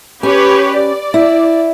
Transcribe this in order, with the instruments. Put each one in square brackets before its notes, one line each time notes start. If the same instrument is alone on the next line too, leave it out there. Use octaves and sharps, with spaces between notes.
[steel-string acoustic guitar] C#4 [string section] G4 B4 C#5
[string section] D5
[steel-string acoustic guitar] E4